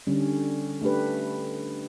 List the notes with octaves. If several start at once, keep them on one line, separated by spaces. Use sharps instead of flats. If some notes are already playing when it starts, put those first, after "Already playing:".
D3 G3 C#4
A3 D4 G4 B4